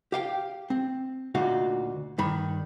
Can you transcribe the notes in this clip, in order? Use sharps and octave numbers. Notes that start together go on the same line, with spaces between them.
G4 F5 G5
C4
D2 A#2 D#4 F#4 F5
G2 D#3 B5